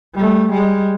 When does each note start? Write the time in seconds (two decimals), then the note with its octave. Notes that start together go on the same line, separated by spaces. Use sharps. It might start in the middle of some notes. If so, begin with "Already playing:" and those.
0.14 G3 A3
0.50 G3 G#3